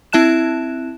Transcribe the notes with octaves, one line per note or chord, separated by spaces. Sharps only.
C4 E4 E5 A5 F#6 E7